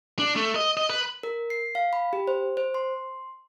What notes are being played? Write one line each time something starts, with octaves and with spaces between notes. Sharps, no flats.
D4
A3
D#5
D#5
B4
A#4
C7
F5
B5
G4
C5
C5
C6